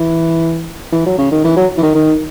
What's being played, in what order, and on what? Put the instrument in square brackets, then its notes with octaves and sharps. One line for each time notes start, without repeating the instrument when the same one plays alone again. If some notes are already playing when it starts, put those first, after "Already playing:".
Already playing: [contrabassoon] E3
E3
F#3
C#3
D#3
E3
F#3
E3
D#3
D#3